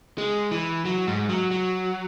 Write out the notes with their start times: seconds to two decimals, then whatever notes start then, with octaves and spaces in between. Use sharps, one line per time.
0.18 G#3
0.51 E3
0.85 F#3
1.07 G#2
1.29 F#3
1.51 F#3